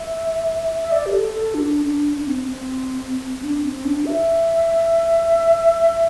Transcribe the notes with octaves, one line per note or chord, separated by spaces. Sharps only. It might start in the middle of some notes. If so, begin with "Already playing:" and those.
Already playing: E5
E5
D5
G4
A4
A4
D4
D4
D4
C4
C4
D4
C4
D4
E5